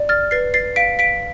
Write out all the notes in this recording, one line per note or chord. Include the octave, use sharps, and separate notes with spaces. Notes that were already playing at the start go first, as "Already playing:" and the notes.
Already playing: D5
F6 A6
B4 A6 C7
A6 C7
F5 B6 D7
B6 D7